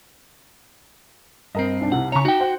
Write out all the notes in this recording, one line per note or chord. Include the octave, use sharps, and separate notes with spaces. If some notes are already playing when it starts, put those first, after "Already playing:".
G2 C4 A#4 D#5
B1 D4
C2 C3 F#5
C#3 C#5 A#5 C#6
D#4 F#4 G5
C5 F#5